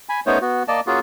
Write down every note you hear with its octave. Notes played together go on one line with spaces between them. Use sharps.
G#5 B5
A3 B3 C#4 D#4 C5 C#5
B3 F#4
A#3 D5 D#5 A5
A#3 C#4 F4 F#4 G#4